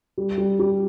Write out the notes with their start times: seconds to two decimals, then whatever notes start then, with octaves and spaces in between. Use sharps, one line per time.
0.18 G3
0.38 G3
0.59 G3